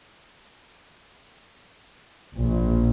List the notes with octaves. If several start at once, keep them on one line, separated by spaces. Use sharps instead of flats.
A#1